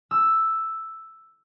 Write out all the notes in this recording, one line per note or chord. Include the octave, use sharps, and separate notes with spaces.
E6